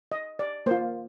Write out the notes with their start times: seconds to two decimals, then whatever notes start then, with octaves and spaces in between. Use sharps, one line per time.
0.12 D#5
0.39 D5
0.66 A#3 F4 C5